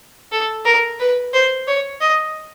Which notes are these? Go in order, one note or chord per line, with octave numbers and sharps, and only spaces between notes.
A4
A#4
B4
C5
C#5
D#5